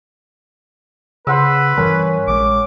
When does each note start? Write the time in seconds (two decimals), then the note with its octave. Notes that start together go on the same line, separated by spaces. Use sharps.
1.27 C#3 B4 C5 F#5 E6
1.77 G2 E3 G3 C#4 A#4
2.27 A#1 D3 G#3 D6